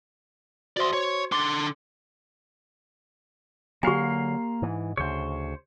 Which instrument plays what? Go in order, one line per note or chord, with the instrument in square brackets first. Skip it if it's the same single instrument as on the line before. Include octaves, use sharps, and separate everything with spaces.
[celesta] F#4 C5 C6 [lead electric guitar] D5 E5
[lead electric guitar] C#5
[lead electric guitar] D3 C6 [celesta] D6 A6
[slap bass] D3 F#3 [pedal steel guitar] A#3 F5 C6 [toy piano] G4 G#5
[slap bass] G#2 E3
[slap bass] D2 C#3 [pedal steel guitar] C5 C#5